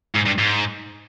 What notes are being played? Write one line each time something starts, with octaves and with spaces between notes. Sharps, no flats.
G#2
G2
G#2